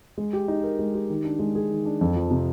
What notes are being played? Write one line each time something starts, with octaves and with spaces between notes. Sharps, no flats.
G#3
G4
D#4
A#4
G#3
G4
D#3
D4
G#3
G#4
D#3
D4
F2
F3
C3